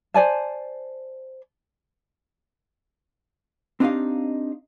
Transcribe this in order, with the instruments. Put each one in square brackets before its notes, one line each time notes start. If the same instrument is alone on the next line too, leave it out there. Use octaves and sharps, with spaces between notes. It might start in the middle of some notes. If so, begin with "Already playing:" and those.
[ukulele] C5 D5 G#5 A5
[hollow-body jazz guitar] C4 D4 D#4 G4 D#5 F5